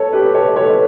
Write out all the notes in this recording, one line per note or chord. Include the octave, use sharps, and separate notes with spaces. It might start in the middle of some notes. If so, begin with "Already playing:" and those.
Already playing: A4 C#5
G4 B4
A4 C#5
A4 C#5